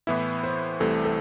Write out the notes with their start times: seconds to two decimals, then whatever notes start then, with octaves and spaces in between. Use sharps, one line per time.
0.07 A2 E3 B3 E4 E5
0.44 C5
0.80 C2 C3 E3 A3 A4
1.05 A4